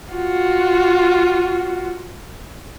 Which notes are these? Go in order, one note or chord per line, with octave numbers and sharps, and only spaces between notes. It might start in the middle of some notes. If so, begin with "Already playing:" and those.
F4 F#4